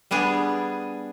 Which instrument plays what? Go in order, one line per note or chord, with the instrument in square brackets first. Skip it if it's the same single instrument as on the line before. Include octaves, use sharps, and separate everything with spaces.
[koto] G3 B3 D4 G#4